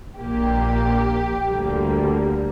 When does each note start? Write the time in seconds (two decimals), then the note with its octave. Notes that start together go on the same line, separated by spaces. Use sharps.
0.19 A#1 A#2 A#3 G4
1.47 D2 D3 G3 A#3